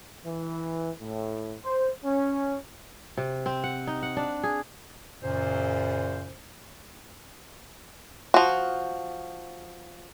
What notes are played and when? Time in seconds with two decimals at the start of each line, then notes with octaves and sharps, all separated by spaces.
0.25 E3
1.01 A2
1.65 C5
2.04 C#4
3.17 C3
3.46 C4
3.64 F#5
3.87 D#4
4.03 F#5
4.17 D4
4.43 G#4
5.22 F#2 A#2 C#3 C5
8.34 F3 F#4